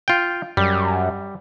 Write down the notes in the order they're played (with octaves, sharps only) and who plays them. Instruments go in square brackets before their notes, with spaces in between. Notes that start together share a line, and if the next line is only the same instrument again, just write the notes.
[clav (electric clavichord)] F4 G5
[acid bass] F#2 [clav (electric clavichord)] G3